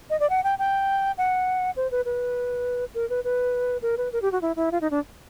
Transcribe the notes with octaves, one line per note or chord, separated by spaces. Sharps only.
D#5
D5
F#5
G5
G5
F#5
C5
B4
B4
A#4
B4
B4
A#4
B4
A#4
G4
F#4
E4
E4
F4
D#4
D4